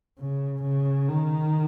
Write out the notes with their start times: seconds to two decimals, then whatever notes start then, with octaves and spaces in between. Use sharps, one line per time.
0.19 C#3
0.63 C#3
1.09 D#3